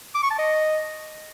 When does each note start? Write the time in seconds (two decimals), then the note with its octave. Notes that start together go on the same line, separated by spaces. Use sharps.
0.15 D6
0.23 C#6
0.31 A5
0.39 D#5